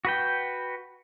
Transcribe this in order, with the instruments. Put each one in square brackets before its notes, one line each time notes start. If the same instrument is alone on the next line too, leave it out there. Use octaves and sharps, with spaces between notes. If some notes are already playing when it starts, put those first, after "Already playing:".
[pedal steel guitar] F#4 B4 G5